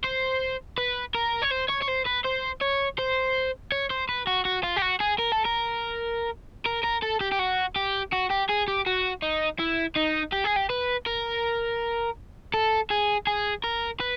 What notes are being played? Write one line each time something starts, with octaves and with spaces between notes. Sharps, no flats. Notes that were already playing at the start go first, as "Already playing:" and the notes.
C5
B4
A#4
C#5
C5
C#5
C#5
C5
B4
C5
C#5
C5
C#5
C5
B4
F#4
F#4
F4
G4
F#4
G#4
A#4
A4
A#4
A#4
A#4
A4
G4
G4
F#4
G4
F#4
G4
G#4
G4
F#4
D#4
E4
D#4
G4
G#4
G4
B4
A#4
A4
G#4
G#4
A#4
B4